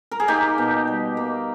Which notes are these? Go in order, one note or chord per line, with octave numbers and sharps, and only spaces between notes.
A#4
G#4
A#3 D#4 G4
B2
G3
A#3